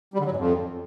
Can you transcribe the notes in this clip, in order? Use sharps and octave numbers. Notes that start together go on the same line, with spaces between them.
G3
D3
F#3
G#2
F2